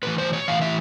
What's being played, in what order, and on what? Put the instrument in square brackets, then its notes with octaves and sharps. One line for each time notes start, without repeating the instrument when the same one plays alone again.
[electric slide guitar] A2 E3 B4
C5
C#5
A2 E3 F5
E5